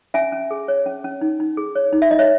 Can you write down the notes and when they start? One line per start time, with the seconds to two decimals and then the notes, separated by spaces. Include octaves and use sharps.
0.14 C#4 E5 G#5
0.32 C#4
0.51 G#4
0.68 C#5
0.86 C#4
1.04 C#4
1.21 D#4
1.40 D#4
1.57 G#4
1.76 C#5
1.93 D#4
2.02 E5
2.11 D#4 D#5
2.19 C#5 E5